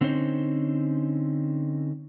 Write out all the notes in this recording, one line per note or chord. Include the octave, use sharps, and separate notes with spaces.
D3 C4 C#4 D#4 C5